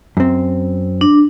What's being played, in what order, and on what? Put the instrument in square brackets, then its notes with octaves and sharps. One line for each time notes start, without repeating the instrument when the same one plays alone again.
[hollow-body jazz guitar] F#2 C4
[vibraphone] D4